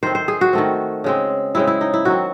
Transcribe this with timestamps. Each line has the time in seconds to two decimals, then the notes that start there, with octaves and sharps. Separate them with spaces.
0.03 D#3 A3 C4 C5
0.15 C5
0.28 G#4
0.41 F#4
0.53 D#3 A3 C4
1.04 C#3 G#3 C4
1.55 C#3 G#3 C4 E4
1.67 E4
1.81 D#4
1.94 E4
2.05 D#3 F#3 C4 F#4